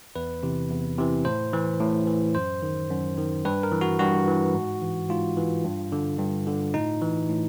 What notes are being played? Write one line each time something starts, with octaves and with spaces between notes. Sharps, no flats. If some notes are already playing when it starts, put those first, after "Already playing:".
E2 B4
C3 E3
E2
C3 E3
A2 C5
E3
A2
E3
F#2 C5
D#3
F#2
D#3
G2 B4
A#4
E3
F#4
G2 F#4
E3
G#2
E3
G#2 F4
E3
G2
D3
G2
D3
A2 D#4
E3
A2